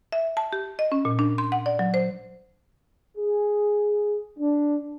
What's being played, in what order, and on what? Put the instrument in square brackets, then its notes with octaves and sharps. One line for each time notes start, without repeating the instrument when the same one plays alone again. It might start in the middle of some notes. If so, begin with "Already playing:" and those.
[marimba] E5
A5
G4
D#5
C#4
A#2
D4
C6
F#5
D5
F#3
C5
[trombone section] G#4
D4